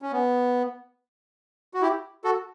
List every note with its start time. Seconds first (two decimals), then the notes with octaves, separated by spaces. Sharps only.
0.02 C#4
0.12 B3
1.74 F#4
1.82 E4 G4
2.24 F#4 A4